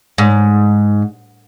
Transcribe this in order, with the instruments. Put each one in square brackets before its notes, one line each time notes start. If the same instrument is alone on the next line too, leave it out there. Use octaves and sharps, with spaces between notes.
[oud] G#2